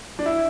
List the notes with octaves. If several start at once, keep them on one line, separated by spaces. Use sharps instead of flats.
D4
E4